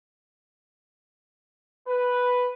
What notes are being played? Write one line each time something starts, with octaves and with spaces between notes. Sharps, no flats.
B4